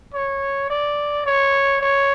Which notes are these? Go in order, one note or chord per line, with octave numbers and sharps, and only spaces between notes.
C#5
D5
C#5
C#5